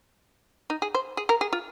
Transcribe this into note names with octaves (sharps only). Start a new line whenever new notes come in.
D#4
G#4
C5
G#4
A#4
G#4
F4